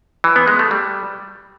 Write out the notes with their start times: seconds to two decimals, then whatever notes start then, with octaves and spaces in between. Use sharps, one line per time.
0.24 E3
0.36 B3
0.48 G#3
0.59 A3
0.71 G3